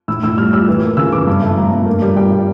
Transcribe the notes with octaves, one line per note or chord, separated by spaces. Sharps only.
A2 E6
A2 E6
G3 F6
G3 E6
E3
A#3
C#3 E6
E3 D6
G2
A3
G2 A#5
G2
A#3
G3
G3 G5
G3